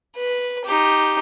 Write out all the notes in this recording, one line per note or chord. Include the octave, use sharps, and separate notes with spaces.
B4
D#4 G4